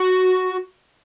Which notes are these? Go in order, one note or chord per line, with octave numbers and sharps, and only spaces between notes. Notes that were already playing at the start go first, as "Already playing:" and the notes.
Already playing: F#4